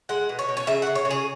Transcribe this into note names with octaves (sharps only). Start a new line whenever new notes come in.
G#3 F#5
B2
C#5
B2
C#5
C#3 E5
C#3 F#5
C#5
C#3
G#4